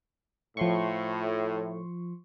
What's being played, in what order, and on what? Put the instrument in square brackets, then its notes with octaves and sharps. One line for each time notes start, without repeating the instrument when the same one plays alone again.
[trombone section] A2 [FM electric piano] F3 C6 C#6